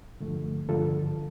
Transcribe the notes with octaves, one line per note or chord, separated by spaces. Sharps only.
G2 D3 F3 A3
G2 D3 F3 F4 A4